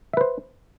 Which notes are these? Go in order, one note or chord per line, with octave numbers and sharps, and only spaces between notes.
B4 C5 E5